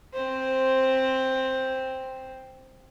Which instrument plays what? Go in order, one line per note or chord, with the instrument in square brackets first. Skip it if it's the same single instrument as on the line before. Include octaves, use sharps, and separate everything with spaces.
[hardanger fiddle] C4 C5